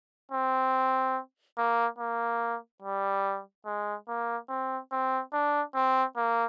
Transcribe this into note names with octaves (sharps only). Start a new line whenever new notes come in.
C4
A#3
A#3
G3
G#3
A#3
C4
C4
D4
C4
A#3